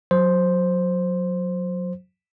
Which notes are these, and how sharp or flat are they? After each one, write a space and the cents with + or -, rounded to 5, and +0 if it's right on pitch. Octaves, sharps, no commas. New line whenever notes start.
F#3 -20 C5 +0